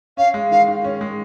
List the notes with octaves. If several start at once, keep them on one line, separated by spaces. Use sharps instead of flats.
C#4 F5
G#3
D#3 F5
D#3
C#4
G#3